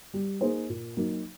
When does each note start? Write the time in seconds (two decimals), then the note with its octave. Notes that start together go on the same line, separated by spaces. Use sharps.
0.14 G3
0.41 A#3 D#4 G#4 C5
0.69 A#2
0.97 F#3 A#3 D#4